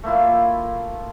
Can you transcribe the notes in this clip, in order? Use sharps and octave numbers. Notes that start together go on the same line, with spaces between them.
A3 A#3 E4 F4